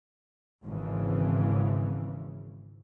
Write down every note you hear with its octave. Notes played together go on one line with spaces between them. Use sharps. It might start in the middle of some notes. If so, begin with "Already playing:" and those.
G#1 G#2 C#3 E3